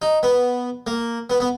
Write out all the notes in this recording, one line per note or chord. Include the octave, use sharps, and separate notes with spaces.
D#4
B3
A#3
B3
B3